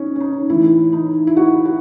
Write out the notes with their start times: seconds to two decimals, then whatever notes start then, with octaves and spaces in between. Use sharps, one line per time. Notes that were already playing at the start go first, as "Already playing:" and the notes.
Already playing: C#4 D#4
0.16 C#4
0.20 D#4
0.49 A2 E3 E4
0.93 D#4
1.27 E4
1.37 F#4
1.65 F#4